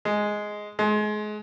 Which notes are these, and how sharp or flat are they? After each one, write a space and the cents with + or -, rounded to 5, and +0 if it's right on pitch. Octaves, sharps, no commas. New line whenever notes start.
G#3 +5
G#3 +30